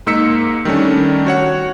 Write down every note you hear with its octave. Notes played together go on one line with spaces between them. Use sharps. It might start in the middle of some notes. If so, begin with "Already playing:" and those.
G#2 A#3 D#4 E6 B6 C#7
D#3 G3 A3 C#4 D4
F#4 C#5 F#5